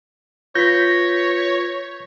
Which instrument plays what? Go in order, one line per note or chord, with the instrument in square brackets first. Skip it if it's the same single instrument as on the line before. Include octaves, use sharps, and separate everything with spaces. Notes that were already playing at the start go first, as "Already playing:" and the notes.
[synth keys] F4 B4 [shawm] C#5 [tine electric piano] G6 [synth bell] A#6 B6